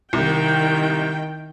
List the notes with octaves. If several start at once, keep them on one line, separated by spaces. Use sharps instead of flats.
C2 D#3 G5